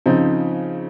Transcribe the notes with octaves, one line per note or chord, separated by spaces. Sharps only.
C#3 F3 C4 D#4